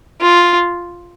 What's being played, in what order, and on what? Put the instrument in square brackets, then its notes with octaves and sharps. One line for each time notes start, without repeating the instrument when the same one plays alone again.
[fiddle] F4